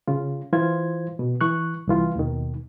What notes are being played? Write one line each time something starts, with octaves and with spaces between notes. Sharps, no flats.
C#3 F4
E3 F4 C5 G#6
B2
E3 C#6 F#6
C2 E3 F4
D#2 B2 D#3